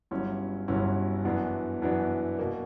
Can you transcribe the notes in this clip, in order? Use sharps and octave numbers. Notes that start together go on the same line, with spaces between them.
G1 G2 F#3 C#4 E4
G1 G2 F#3 C#4 E4
F#2 E3 B3 D4
F#2 E3 B3 D4
B2 A#3